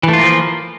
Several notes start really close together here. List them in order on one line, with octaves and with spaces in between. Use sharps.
E3 A3 F4 A#3 F3